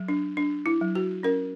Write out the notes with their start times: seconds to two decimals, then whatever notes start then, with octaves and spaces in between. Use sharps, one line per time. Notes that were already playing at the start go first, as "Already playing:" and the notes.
Already playing: F#3
0.08 D4
0.37 D4
0.66 E4
0.81 F#3
0.95 F#4
1.23 C#4 A#4